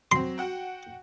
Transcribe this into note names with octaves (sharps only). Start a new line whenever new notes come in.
F#3 C4 C6
F#4 F#5 G5